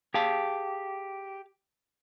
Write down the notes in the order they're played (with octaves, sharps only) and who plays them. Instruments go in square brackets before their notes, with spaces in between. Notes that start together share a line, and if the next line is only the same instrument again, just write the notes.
[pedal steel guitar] G4 [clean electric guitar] G#4 F5 A5